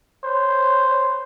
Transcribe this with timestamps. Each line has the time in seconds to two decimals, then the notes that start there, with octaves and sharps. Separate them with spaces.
0.24 C5 C#5